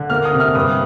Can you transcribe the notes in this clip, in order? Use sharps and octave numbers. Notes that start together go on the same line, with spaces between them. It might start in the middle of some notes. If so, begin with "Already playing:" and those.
Already playing: D3
A#3 F6
D#6
C3
F6
G2 D#6